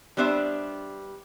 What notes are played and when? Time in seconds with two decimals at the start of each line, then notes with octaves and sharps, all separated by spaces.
0.17 G3 B3 D4 C5 E5